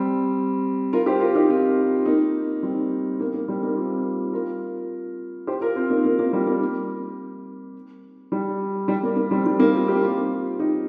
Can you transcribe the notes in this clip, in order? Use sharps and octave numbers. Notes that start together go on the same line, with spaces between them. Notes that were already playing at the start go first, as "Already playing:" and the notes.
Already playing: G3 C4
F4 A#4
G4 C5
F4 A#4
D#4 G4
C4 F4
A#3 D#4
G3 C4
A#3
A#3
G3 C4
A#3 D#4
C4 F4
F4 A#4
G4 C5
F4 A#4
C4 F4
A#3 D#4
A#3
A#3
G3
A#3
G3
G3
A#3
A#3
G3 C4
G3 C4
A#3 D#4
C4 F4
D#4 G4
C4 F4
D#4 G4